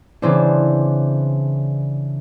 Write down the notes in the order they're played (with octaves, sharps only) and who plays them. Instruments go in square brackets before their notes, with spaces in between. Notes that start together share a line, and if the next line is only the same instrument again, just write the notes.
[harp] C#3 E3 C4 D4